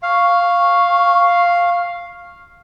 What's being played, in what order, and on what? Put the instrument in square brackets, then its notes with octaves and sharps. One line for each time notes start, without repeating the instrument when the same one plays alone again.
[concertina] F5 [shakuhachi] C#6